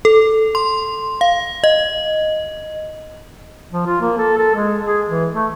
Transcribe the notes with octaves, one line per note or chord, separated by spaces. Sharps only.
A4
C6
F5
D#5
F3
F4
A#3
A4
A4
G#3
G#4
E3
A3